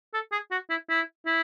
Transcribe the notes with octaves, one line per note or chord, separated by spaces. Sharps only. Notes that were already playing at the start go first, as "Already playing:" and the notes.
A4
G#4
F#4
E4
E4
E4